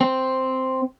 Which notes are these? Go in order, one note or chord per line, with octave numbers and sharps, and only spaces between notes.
C4